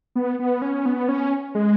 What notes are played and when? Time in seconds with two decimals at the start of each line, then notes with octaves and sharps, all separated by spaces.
0.16 B3
0.39 B3
0.62 C#4
0.86 B3
1.09 C#4
1.55 G#3